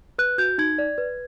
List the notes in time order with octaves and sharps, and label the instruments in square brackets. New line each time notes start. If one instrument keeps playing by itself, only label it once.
[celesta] B4 F#6
F#4 G6
D#4 G#6
D5
B4